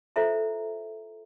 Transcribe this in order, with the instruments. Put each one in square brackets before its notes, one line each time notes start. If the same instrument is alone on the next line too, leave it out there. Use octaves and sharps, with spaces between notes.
[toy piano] E4 F4 A4 C5 E5 A#5